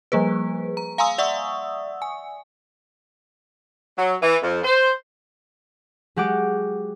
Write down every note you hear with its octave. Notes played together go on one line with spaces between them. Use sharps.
F3 G3 A#3 G#4 B4
A#5
F5 G#5 A#5 C6 D#6 E6
D5 E5 F#5 C#6 D#6 E6
G#5
F#3
E3
F2
C5
F#3 G#3 G4 F#5 D6